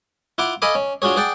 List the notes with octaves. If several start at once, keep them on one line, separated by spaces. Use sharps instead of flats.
E4 F4 F#5 D6
A4 D#5 F5 G#5 B5 D6
C#4
D4 F4 F#4 G#4 C#5
G#4 D5 F#5 G5 A5